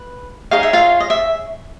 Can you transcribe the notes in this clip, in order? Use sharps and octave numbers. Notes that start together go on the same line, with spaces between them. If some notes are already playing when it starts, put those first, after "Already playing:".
Already playing: B4
D#4 G#4 C#5 F5
E5
F4 F5
D#5
E5